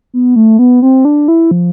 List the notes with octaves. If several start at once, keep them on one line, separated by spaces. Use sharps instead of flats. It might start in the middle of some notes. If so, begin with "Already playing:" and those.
B3
A3
B3
C4
D4
E4
F3